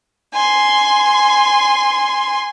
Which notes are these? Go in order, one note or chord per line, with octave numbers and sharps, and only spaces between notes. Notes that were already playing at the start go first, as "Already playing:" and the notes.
G#5 C6